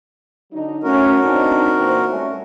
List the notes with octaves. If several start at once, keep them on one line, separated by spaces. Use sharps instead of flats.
D3 F#3 D#4
A3 C#4 F#4 A#4
C4 D4 D#4
A#2 E3 C4
G3 A3 C#4